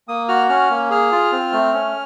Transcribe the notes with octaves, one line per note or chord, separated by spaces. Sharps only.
A#3 D#6
F#4 F6
C#4 F6
A#3
G#4 F6
F4
C4
A3
C#4